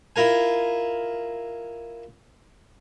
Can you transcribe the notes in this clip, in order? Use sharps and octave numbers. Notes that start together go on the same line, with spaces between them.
E4 F4 A#4 G#5